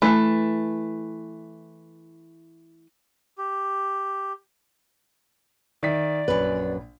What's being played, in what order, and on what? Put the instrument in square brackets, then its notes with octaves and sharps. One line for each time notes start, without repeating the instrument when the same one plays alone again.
[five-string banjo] E3 A3
[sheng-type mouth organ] G4
[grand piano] D#3 E5 B6 [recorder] D5
[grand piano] A#1 [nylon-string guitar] F#2 B4